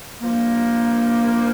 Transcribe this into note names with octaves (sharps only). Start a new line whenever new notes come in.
G2 F3 A#3